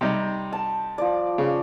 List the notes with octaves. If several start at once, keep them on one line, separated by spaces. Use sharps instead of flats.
C3 G3 D#4
A5
F3 D5
C#3